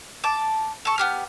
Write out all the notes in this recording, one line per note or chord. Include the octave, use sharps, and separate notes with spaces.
A5 D6
A4 C#6
B3 G4 F6